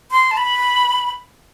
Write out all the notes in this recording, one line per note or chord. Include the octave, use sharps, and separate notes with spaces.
C6
A5
B5